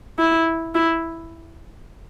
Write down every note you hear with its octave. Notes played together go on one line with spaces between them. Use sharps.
E4
E4